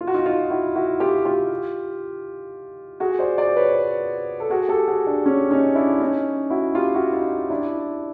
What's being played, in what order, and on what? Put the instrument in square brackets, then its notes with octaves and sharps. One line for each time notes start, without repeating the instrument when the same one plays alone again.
[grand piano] F4
F#4
D#4 F4
D#4 F4
E4 F#4
E4 F#4
F4 G4
F4 G4
F#4 G#4
C5 D5
C5 D5
B4 C#5
A4
F#4 G#4
G4 A4
F#4 G#4
D4
C#4
C#4 D#4
D4 E4
C#4 D#4
E4 F#4
F4 G4
E4 F#4
D#4 F4
D4 E4